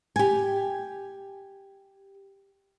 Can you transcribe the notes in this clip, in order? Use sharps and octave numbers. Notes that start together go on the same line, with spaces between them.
G4 G#5